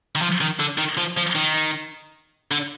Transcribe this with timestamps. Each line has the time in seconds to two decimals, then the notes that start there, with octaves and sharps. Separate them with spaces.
0.15 D#3
0.22 F3
0.41 D#3
0.60 D3
0.78 D#3
0.98 F3
1.17 F3
1.35 D#3
2.51 D3